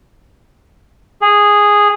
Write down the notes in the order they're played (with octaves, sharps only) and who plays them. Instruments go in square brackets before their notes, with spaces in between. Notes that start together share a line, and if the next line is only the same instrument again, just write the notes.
[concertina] G#4